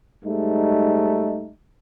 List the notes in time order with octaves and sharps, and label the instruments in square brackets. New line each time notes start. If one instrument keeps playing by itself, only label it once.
[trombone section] G#2 G3 A3 D#4